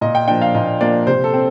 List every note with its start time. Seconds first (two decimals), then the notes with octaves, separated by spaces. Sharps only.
0.01 A#2 D#5
0.15 G5
0.28 F3 A#3 D4 G5
0.41 F5
0.55 A#2 D#5
0.81 F3 A#3 D4 D5
1.07 C3 C5
1.24 A4
1.34 C4